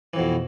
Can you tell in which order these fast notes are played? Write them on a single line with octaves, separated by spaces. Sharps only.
E3 F2 B2